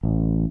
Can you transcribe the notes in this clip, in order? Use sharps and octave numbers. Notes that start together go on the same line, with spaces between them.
A1